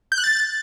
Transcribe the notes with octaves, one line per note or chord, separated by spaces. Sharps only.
G6
F#6
A6